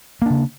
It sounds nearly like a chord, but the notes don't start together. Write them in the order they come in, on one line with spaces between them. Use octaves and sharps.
A#3 D4 C#3